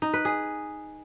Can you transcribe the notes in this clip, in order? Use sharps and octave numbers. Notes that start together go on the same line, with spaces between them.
D#4
B4
G#4